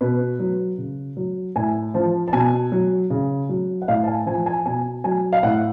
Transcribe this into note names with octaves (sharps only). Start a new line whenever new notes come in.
B2 B4
F#3
C#3
F#3
A2 G#5
F3 A5
A5
B2 G#5
F#3
C#3
F#3
F#5
A2 F5
A5
G#5
F3 G#5
G#5
B2 G#5
F#3 G#5
F5
A2 F#5